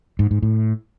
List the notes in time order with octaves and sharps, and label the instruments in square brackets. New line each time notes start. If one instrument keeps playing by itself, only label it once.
[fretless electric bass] G#2
G#2
A2